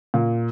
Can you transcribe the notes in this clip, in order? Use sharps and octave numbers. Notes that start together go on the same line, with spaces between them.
A#2